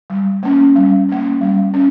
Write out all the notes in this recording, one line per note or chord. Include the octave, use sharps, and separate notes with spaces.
G3
A#3 C#4
G3
A#3 C#4
G3
C#4